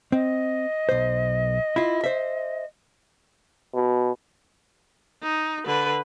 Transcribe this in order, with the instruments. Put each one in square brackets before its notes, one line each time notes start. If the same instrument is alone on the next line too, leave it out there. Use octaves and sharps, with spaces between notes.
[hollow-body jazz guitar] C4 [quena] D#5
[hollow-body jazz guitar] B1 C5
E4 F4
C5 E5
[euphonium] B2
[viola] D#4
D3 B4